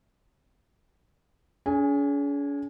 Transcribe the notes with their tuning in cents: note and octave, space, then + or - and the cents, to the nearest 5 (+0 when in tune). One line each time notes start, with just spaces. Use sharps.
C#4 +45 G#4 +30 G#5 -15